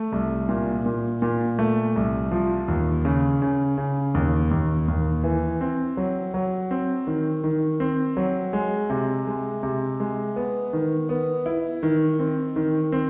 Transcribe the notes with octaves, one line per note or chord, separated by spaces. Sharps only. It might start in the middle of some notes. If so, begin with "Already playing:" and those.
Already playing: A3
C2
A#2
A#2
A#2
A3
C2
F3
D#2
C#3
C#3
C#3
D#2
D#2
D#2
E3
C4
F#3
F#3
C4
D#3
D#3
C4
F#3
G#3
C3
G#3
C3
G#3
B3
D#3
B3
E4
D#3
C4
D#3
C4